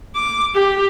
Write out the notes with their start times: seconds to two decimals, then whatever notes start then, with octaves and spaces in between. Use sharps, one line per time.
0.16 D6
0.55 G4